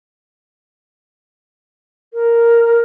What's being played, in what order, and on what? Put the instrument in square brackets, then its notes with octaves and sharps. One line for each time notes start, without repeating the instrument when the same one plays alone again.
[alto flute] A#4